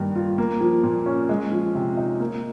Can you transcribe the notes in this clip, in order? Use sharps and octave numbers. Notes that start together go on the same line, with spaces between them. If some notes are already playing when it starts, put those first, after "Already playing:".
Already playing: G2 D#3 A#3
F4
A#3
F3
A#2
C#4
G#3
F3
C3
D#4
A#3